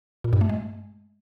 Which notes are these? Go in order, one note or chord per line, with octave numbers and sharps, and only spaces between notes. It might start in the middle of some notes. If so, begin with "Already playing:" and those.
A#2
G2
A3
G#3